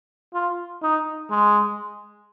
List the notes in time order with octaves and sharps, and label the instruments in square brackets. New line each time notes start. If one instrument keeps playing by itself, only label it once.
[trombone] F4
D#4
G#3